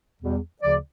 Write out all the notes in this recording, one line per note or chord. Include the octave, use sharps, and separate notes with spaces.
E2 B2 G3
D2 C#3 F3 D5